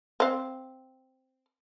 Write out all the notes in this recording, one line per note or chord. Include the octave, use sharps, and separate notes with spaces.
C4 F5